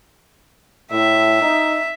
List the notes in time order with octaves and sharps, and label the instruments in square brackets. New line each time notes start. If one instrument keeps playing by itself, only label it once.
[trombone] A2 [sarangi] E5
[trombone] D#4